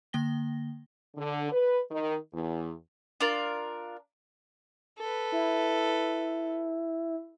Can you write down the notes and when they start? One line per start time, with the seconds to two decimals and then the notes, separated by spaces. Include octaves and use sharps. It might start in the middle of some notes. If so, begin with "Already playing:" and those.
0.13 D3 A#3 G5 A#6 G7
1.17 D3
1.52 B4
1.91 D#3
2.33 E2
3.21 D4 F4 A#4
5.00 A4 B4
5.32 E4